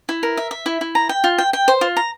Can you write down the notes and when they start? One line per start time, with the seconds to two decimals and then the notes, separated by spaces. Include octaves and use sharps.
0.09 E4
0.23 A#4
0.37 E5
0.51 E5
0.66 E4
0.81 E4
0.95 A#5
1.09 G5
1.24 F4
1.38 G5
1.53 G5
1.68 C5
1.81 F4
1.97 A#5